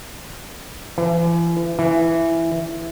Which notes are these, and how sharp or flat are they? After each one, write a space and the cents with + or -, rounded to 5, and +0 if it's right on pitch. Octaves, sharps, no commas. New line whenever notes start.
E3 +40
E3 +5